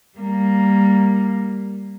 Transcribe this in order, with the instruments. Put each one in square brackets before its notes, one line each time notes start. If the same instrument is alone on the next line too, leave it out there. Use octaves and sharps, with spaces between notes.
[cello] G3 A#3